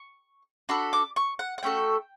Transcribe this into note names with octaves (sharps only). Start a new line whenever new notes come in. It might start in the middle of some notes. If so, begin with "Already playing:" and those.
Already playing: C#6
D4 F#4 A4 B5
D6
C#6
F#5
F#5
A3 C#4 F#4 A4 G5